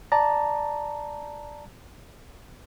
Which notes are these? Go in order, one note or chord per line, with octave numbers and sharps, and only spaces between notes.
D5 A5 A#5